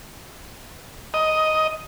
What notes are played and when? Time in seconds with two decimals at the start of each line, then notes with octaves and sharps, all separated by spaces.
1.14 D#5